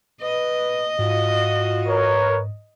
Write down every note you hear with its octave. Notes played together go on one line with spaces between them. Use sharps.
B4 D#5
G#2 F4 F#4
A#4 B4 C#5